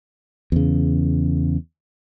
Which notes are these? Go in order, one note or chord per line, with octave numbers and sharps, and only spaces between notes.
E2 C#3